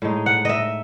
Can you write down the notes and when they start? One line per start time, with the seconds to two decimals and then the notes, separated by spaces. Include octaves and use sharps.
0.02 A2 G#3 D#4
0.26 F#5
0.45 D#5 E5